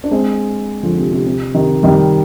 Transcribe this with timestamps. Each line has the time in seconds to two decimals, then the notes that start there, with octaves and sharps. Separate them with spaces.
0.04 D4
0.11 G#3 C4
0.83 D3 F3
0.98 C3
1.12 C3
1.26 C3
1.55 C3 D#3
1.83 D#3 G3